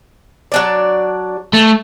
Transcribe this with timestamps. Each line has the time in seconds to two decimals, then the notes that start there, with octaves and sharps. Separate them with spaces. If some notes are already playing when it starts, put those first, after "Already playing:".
0.52 F#3 D4 D5
1.54 A3